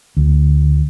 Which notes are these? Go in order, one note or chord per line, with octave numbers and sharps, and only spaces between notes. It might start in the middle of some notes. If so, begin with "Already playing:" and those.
D2